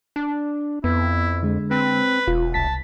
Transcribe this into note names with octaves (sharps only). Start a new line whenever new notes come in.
D4
F2 B3 E4
D3 G#3
C4 B4
E1 F4
C2 A5 B6